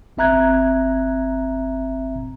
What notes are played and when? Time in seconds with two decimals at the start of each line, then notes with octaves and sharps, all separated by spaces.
0.17 G1 C4 E5 A#5 F#6 G#6